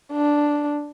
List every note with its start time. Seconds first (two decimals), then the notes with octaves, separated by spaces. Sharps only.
0.12 D4